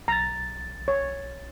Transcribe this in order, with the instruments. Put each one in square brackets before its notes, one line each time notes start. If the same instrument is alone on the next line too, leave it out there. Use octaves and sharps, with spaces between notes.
[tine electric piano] B1 A6 [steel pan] A#5
[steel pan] C#5